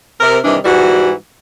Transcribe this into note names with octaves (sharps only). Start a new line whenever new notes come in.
C3 A#4
C3 D#3 E3 G3 D4
G#2 E3 G3 F#4